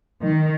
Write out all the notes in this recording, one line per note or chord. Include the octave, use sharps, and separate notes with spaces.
D#3